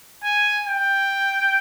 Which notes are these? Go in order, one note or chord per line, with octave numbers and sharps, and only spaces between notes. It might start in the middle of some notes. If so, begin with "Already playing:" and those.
G#5
G5